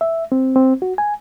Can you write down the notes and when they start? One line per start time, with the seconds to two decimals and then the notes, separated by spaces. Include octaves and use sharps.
0.01 E5
0.32 C4
0.56 C4
0.82 F#4
0.98 G#5